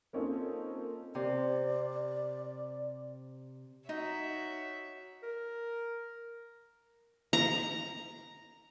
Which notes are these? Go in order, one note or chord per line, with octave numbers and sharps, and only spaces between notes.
A#3 C4 C#4 D#4 F4 A4
C3 D5
D#4 F#4 C#5 E5
A#4
A#5